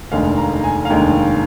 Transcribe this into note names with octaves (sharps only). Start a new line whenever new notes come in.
F1 D#2 D3 G#3 F5
A#5
G#5
F5
F1 D#2 D3 G#3 G5